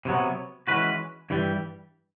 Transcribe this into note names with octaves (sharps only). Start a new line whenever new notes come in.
C3 D#3 F#3 B3
E3 G#3 C#4 F#4 B4
G2 E3 G3